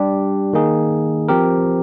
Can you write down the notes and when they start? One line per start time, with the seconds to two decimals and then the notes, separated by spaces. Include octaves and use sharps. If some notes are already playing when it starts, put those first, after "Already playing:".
Already playing: G3 D4 G4
0.53 D#3 A#3 D#4 G#4
1.28 F3 C4 G4 A#4